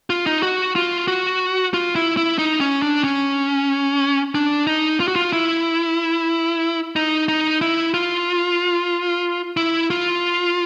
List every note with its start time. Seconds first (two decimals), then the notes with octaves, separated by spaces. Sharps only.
0.10 F4
0.26 D#4
0.43 F#4
0.76 F4
1.08 F#4
1.74 F4
1.95 E4
2.17 E4
2.38 D#4
2.60 C#4
2.82 D4
3.04 C#4
4.35 D4
4.67 D#4
5.00 F4
5.08 F#4
5.16 F4
5.33 E4
6.96 D#4
7.28 D#4
7.61 E4
7.94 F4
9.57 E4
9.90 F4